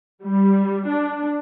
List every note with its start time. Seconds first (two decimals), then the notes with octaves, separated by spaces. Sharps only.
0.23 G3
0.88 D4